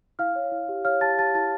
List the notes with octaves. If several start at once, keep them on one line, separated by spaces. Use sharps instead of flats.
E4 F5 F6
C#5
E4
G4
C#5 F5 F6
G4 A5 A6
G4 A5 A6
E4 A5 A6